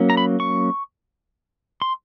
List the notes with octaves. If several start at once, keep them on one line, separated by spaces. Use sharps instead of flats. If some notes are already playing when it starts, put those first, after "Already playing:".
Already playing: F#3 A#3 C#4
A#5
B5
C#6
C6